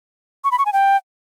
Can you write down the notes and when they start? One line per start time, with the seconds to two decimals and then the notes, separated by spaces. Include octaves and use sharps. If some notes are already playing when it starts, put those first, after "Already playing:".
0.44 C#6
0.51 B5
0.58 C#6
0.66 G#5
0.73 G5